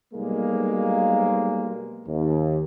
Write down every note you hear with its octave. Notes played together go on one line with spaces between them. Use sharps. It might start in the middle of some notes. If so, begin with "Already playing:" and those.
B1 G3 G#3 A#3
D#2